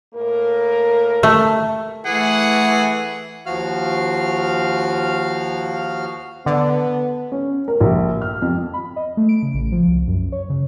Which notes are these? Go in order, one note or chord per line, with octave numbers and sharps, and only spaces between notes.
A2 A#3 A#4
A3
E3 A3 G#4 F#5
D#2 F3 F#4 F5 F6
D3 B3
C#4
A#4
A#1
F6
F2
B5
D#5
A3
D7
C#3
A1
F3
C2
F#2
C#5
C#3